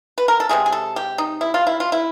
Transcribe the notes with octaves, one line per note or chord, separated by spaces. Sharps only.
B4
A#4
A4
C3 D#3 G#3 G#4
G#4
A4
G4
D#4
E4
F4
E4
F4
E4